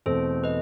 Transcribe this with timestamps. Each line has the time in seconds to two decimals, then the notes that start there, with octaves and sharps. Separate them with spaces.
0.06 E2 B2 A3 C4 A4 C5
0.44 B4 D#5